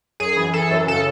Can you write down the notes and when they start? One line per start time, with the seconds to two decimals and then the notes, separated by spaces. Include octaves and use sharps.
0.20 F#2 G#4
0.37 E3
0.53 E3 A4
0.71 F#2
0.87 C#3 A4